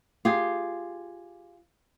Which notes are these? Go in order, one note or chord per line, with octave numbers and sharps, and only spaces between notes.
F4 G4 G#4